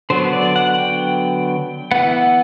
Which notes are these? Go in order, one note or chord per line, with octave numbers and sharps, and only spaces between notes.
D3 F#3 B3 C5
D5
F#5
G5
E3 B3 F#5